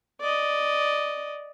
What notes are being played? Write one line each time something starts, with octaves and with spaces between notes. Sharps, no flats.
D5 D#5